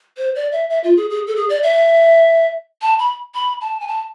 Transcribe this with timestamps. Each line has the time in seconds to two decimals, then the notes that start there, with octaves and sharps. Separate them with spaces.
0.17 C5
0.35 D5
0.52 E5
0.70 E5
0.84 F4
0.97 G#4
1.10 G#4
1.27 A4
1.36 G#4
1.50 D5
1.63 E5
2.82 A5
2.99 B5
3.35 B5
3.61 A5
3.80 G#5
3.88 A5